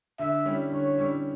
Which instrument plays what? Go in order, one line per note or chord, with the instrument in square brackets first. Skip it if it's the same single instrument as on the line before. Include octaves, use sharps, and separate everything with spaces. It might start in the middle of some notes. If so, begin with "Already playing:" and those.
[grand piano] D3 [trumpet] E5
[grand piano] G3 C#4 E4
[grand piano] D3 [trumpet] C#5
[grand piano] G3 C#4 E4